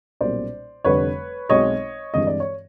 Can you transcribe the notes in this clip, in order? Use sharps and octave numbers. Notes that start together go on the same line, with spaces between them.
B1 A#2 G3 A#3 C#4 C5 D5
F1 F2 D3 G3 B4 C#5
B1 B2 G#3 C4 C#5 D#5
G2 E3 G#3 C4 D#5
D5
C#5